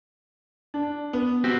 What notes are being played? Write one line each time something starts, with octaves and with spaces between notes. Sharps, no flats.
D4
B3
C4 F#4 G4